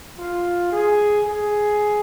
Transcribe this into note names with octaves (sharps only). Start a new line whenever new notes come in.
F4
G#4
G#4